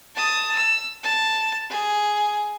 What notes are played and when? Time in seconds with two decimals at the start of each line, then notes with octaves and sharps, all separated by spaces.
0.15 A5 D#6
0.55 E6
1.03 A5
1.70 G#4